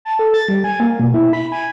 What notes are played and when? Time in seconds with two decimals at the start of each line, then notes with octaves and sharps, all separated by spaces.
0.05 A5
0.19 A4
0.34 A6
0.48 G3
0.64 G#5
0.80 A#3
1.00 B2
1.14 E4
1.33 B5
1.52 G#5